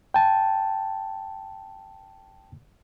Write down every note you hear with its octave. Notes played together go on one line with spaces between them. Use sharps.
G5 A5